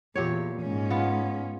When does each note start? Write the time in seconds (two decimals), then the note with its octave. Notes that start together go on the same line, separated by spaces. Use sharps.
0.15 E2 A#2 G4 C#5
0.61 G#2 C#4
0.90 B3 F4